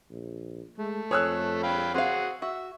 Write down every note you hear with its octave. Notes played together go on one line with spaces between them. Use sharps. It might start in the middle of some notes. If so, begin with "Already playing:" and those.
A#1
G#3 A3
F2 G#4 C#5 E6 F#6
F5 G5 B5
C4 F#4 G#4 F5 F#5
F#4 E5